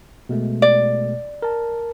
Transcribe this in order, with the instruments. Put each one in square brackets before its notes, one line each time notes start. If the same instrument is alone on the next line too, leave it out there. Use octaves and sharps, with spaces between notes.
[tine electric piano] B2 G#3 A3
[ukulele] D5
[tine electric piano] A#4 A5